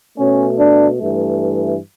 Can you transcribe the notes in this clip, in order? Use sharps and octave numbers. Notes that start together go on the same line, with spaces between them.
B2 A3 C#4
D4
G2 E3 A3